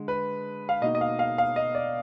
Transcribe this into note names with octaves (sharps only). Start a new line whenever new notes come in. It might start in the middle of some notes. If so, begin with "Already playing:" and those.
Already playing: D3 G#3
B4
F5
B2 A#3 D#4 D#5
D#5
F5
F5
F5
D#5
D5